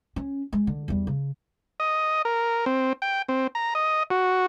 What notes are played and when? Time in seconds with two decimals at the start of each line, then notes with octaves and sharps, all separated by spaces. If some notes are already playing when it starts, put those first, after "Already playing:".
0.16 C#4
0.53 G#3
0.67 D3
0.88 E2 G3
1.07 C#3
1.80 D#5
2.25 A#4
2.66 C4
3.02 G5
3.29 C4
3.55 A#5
3.75 D#5
4.10 F#4